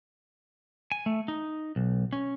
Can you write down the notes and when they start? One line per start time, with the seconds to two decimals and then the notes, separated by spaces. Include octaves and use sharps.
0.92 G#5
1.06 A3
1.28 D#4
1.76 B1
2.13 C#4